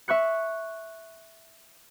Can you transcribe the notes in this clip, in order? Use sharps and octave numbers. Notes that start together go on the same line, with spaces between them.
E5 C#6 F#6 C#7